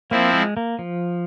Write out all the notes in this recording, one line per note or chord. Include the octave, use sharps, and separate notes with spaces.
F3 A#3 C4 E4
G#3
A#3
F3